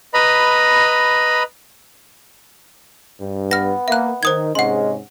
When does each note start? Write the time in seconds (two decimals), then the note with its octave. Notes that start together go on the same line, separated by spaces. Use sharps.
0.14 B4 D#5 A#5 B5
3.20 G2
3.51 B3 F6 A#6
3.88 A#3 E5 F#6
4.23 D#3 C5 D#6 G#6
4.55 G#2 C3 G#3 C#4 F#5 C6